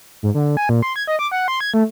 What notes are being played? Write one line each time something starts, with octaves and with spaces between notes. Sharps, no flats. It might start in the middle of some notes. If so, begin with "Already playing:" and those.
G#2
D3
G#5
A#2
C6
G#6
D#5
D6
F#5
C6
G#6
A3